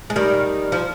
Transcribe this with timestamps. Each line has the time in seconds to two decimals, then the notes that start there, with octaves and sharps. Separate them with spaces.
0.10 G#3
0.16 D#3 G3
0.72 F3